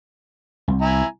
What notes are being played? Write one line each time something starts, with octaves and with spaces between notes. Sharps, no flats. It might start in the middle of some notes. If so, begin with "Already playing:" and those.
C2
E4 G#5 A#5